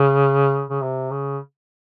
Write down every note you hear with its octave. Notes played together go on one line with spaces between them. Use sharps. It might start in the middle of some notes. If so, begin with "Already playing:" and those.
Already playing: C#3
C#3
C3
C#3